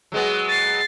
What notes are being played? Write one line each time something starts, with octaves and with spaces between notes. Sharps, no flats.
F#3 G#3 B3
A6 C7